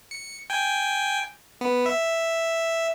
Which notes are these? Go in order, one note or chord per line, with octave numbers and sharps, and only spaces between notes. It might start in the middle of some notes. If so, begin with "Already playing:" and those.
C#7
G5 G#5
B3
E5